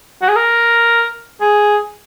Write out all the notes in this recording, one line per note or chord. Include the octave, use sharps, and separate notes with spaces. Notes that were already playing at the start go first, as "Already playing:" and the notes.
F#4
G#4
A#4
G#4